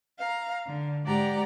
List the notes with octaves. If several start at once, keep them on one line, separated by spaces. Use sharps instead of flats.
F5 A#5
D3
G#2 G#3 G4 D5 F#5 A#5